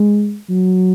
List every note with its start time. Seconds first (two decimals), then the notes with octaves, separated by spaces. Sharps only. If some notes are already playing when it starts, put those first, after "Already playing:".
Already playing: G#3
0.49 F#3